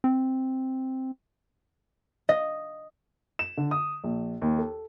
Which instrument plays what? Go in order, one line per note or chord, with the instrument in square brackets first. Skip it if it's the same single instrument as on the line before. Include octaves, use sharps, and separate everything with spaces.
[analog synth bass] C4
[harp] D#5
[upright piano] E7
D3
D#6
A#1
D#2
A4